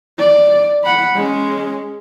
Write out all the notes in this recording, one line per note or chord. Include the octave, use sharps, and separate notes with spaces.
D5
F#5 B5
G#3 C#4